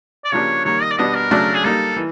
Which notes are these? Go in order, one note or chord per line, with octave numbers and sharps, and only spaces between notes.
D5
C#3 F3 A#3 D4 G4 C#5
D#3 G3 A#3 C#5
D#5
D5
B2 G3 B3 D4 D#5
A#4
C#3 F#3 A3 D4
G#4
G3 A#3 D#4 A4
E3